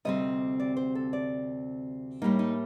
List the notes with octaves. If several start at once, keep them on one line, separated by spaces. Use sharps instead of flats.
D2 C3 G3 C4 D#5
D5
C5
A4
D5
A2 G3 A#3 D#4
D#4